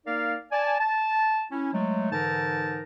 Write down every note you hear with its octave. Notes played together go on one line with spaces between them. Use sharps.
A#3 D#4 A#4 D5 F5
D5 G#5 A5
A5
C#4 E4
F#3 G#3 A3
G#2 D3 E3 D#4 A#4 A5